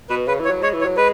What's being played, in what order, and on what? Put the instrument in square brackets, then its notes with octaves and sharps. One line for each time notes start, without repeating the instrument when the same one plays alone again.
[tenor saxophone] B2 [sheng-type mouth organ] B4
[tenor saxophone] C#3 [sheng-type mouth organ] B4
[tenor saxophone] E3 [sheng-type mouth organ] C#5
[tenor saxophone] F#3
[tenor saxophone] G#3 [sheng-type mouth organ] C#5
[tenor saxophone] E3
[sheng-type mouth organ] C#5
[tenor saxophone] F#3
[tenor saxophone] G#3 [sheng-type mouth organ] B4